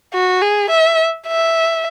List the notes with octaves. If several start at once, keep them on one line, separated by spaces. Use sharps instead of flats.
F#4
G#4
E5
E5